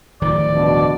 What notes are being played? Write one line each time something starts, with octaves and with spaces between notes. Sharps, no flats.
D1 D#3 F3 D5
B2 D4